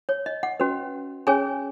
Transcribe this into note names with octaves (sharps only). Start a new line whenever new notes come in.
C#5
D#5
F#5
C#4 F#4 B4
C#4 G#4 C#5 G#5